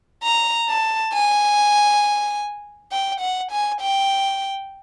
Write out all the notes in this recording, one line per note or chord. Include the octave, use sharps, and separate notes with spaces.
A#5
A5
G#5
G5
F#5
G#5
G5